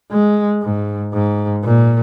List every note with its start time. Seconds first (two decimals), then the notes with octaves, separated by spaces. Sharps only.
0.11 G#3
0.62 G#2
1.13 G#2
1.64 A#2